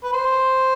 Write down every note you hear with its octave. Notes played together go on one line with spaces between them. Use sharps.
B4
C5